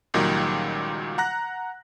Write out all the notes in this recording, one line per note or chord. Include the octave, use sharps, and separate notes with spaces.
C#2 A#2 D#3 F#3 G3
F#5 A#5 F#6 A#6